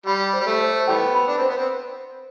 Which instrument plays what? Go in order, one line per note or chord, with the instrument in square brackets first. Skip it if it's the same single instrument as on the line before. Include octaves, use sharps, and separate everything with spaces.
[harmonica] G3 [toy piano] B5
[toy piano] C5
[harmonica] G3
A3
[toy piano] C5
[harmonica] E3 G3 B3 [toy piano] G5
[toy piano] B5
[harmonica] D4
[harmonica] C4 [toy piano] C5
[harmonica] B3
C4